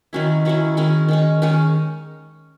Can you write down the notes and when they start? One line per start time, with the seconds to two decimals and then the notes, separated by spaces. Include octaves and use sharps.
0.13 D#3 F#3 C#4 E4
0.45 D#3 F#3 C#4 E4
0.77 D#3 G#3 C#4
1.08 D#3 G#3 C#4
1.42 D#3 G#3 C#4